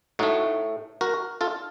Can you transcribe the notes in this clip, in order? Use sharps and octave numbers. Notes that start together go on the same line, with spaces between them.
A2 A3 D#4 F#4
F#4 A#4
F4 A4